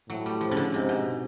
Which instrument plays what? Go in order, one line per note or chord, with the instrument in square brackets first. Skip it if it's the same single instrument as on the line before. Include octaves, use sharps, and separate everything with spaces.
[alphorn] A2 [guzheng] F#3
[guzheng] G3
F3
C#3
D3
[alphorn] G#2 [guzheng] C3
[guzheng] B2